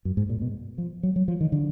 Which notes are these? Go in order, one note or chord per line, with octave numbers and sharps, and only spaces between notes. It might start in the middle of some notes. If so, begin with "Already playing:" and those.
F#2
G#2
A#2
B2
F3
F#3
F#3
F3
D#3
D3